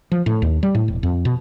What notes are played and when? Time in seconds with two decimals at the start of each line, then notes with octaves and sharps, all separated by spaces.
0.11 F3
0.26 A2
0.42 D#2
0.63 G3
0.75 A2
0.88 E1
1.03 F2
1.25 B2